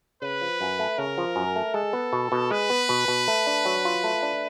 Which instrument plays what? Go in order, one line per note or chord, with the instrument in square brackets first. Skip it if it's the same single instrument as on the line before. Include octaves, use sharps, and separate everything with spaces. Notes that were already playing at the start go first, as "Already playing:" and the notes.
[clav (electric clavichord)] C#3 [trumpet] B4
[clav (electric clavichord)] F3
F#2
A3
[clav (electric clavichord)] C#3 [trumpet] A#4
[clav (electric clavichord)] F3
F#2
A3
[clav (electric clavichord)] G#3 [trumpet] A4
[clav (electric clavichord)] B3
B2
B2
[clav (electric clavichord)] G#3 [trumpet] B4
[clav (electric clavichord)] B3
B2
B2
A3
D4
F#3
F4
A3
D4